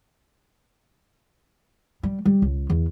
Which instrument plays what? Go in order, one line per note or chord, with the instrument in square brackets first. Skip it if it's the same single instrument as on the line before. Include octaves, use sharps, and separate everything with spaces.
[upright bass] G3
G3
C#2
E2